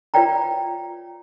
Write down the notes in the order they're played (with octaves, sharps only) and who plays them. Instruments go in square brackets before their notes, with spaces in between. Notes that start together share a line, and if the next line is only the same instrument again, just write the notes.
[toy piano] F4 B4 C#5 D5 G5 A#5